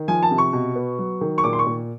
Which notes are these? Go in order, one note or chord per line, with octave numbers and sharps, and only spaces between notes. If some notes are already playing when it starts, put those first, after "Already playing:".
Already playing: D#3
F3 G#5
A5
C3
C#6
B2
B3
F#3
D#3
C#6
A#2 D6
C6
C#6
A#2